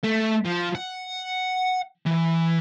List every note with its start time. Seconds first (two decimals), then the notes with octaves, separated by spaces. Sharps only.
0.04 A3
0.45 F3
0.75 F#5
2.06 E3